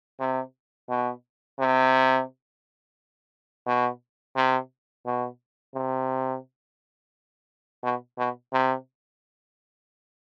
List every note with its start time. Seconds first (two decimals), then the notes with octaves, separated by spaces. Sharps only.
0.20 C3
0.89 B2
1.59 C3
3.67 B2
4.36 C3
5.06 B2
5.75 C3
7.84 B2
8.19 B2
8.53 C3